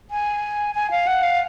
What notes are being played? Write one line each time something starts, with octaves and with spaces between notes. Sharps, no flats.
G#5
G#5
F5
F#5
F5